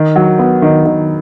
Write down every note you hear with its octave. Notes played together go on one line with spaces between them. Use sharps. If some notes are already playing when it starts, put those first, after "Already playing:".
Already playing: D#3
F#3
B3
D#3
D#3